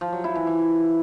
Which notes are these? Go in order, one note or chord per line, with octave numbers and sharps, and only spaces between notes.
F3
F#3
E4
E3
E3